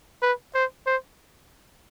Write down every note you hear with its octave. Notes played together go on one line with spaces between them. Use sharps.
B4
C5
C5